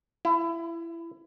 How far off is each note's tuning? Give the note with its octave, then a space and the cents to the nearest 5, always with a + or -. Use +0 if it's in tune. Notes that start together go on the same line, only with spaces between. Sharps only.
E4 +20